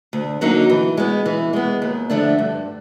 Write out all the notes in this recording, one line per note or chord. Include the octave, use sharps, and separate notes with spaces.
D2
D3 F#3 A#3 D#4
E3
G#3 B3
E3
G#3 B3
D#2
D3 F3 A3 D4
G2